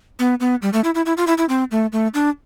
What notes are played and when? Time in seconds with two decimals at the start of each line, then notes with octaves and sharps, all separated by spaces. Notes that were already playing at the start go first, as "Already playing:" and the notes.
0.19 B3
0.40 B3
0.62 G3
0.73 A3
0.84 E4
0.95 E4
1.06 E4
1.17 F4
1.27 E4
1.38 E4
1.49 C4
1.71 A3
1.92 A3
2.14 D4